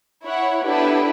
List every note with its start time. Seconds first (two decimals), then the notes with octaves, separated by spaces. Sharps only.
0.25 E4 C#5 F#5
0.63 B3 D4 E4 G4 A4 B4